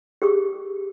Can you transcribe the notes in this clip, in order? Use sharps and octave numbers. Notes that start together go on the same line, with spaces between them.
G4 G#4 C#6